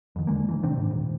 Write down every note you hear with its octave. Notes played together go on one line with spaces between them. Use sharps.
F2 D#3
D#2 D3 G#3 A#3
A1 C3 E3
C3 D#3 C4 D4
G#2
D#1